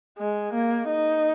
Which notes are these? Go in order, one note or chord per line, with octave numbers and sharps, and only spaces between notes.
G#3
A#3
D#4